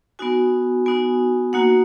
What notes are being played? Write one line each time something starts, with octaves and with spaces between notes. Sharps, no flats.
B3 D#4 F#4 G#5
B3 D#4 F#4 G#5
A#3 D#4 F#4 F#5